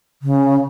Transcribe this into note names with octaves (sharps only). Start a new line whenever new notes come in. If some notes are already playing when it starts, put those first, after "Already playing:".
C#3